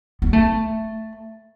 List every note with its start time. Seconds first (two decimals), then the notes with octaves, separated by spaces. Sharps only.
0.22 B3
0.33 A3